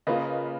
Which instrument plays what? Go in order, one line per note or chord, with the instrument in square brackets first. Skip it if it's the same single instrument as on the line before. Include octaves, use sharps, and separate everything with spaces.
[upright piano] C#3 [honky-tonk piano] A#3 F4 B4 D#5